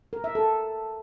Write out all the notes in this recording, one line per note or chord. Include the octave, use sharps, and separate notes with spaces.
A#4
E5
A4